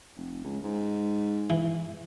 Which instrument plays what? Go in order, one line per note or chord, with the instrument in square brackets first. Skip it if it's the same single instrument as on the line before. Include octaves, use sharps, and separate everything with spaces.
[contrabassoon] F1
C#2
G#2
[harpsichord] E3